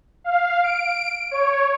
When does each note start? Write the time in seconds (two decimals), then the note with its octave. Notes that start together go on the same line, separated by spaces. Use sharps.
0.24 F5
0.63 D7
1.31 C#5